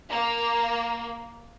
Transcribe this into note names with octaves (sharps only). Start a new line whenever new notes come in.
A#3